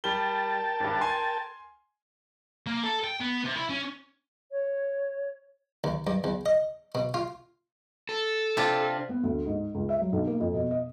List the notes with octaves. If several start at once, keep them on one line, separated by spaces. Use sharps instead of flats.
G3 A#4 G5 A5 G7
G#1 G2
G#5 C6
A#3
A4
G5
B3
C3
E4
C#4
C#5
D#2
G2
E2
D#5
B2
F4
A4
C3 D4 F4
B3
D2
G#2
C#2
E5
F#3
B1
A#3
F2
B2
D#5